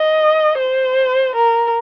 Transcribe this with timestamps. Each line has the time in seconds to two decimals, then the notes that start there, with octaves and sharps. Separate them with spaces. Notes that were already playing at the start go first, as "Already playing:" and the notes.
Already playing: D#5
0.58 C5
1.35 A#4